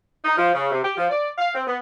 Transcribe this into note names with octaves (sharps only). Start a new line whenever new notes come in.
D#4
F3
C#3
C3
G4
F3
D5
F5
C4
B3